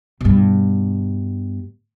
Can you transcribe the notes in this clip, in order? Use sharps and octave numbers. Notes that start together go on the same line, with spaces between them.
G2 B2